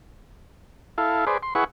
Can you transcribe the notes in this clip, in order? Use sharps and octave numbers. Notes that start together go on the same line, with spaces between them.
E4 A4 F5
G#4 B4 C5 D5
C6
E4 G#4 B4 F#5 C#6